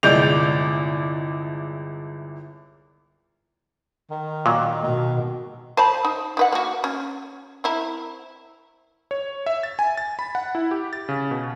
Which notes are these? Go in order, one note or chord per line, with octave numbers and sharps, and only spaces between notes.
G1 C2 G#3 D5 G6 F7
D#3
A#2 F#3
B2 D#3
C5 A5 B5
D#4
D#4 B4 F#5
A#3 F#4
C#4
C4 E4 A#4
C#5
E5
A6
G#5
A6
B5
F#5
E4
G4
A6
C#3
B2